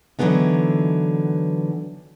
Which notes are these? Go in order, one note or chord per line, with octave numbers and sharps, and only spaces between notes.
D3 E3 F#3 A3 B3 D#4